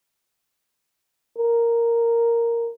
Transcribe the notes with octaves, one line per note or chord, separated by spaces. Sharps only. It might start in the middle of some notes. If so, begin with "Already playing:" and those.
A#4